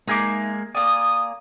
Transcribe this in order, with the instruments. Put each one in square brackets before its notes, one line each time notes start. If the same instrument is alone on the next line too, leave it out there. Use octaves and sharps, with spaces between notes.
[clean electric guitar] G#3 A#3 G#4 [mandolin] D#4 E5 D6
[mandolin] A#3 G#5 [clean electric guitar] D5 [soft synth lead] D#6